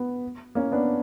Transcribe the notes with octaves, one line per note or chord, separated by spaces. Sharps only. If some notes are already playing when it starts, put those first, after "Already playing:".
Already playing: B3
A#3 C#4
B3 D4